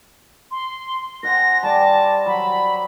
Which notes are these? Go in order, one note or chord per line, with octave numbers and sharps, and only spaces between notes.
C6
C5 F#5 G#5 A#6
G3 D5 A5
F#3 B5